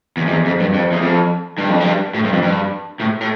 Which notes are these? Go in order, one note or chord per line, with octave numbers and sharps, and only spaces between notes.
E2
F2
E2
F2
G2
F2
E2
F2
G2
F2
G2
A2
G2
F2
G2
A2
A2